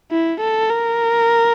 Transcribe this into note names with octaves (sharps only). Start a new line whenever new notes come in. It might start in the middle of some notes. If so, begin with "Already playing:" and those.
E4
A4
A#4